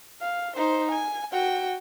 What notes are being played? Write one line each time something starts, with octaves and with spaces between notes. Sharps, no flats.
F5
D#4 C5
G#5
F#4 G5